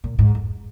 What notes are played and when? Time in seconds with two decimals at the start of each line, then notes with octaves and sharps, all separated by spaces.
0.04 A#2
0.19 G#2
0.35 F2